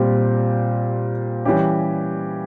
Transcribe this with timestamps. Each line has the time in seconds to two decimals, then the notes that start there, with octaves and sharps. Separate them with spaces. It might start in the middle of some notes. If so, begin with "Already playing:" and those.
Already playing: A#2 G3 C4 G4
1.45 E3 G3 C#4 G4